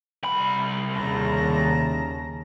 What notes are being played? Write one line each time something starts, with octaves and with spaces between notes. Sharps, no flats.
C2 B5
D#2 C#3 A5 A#5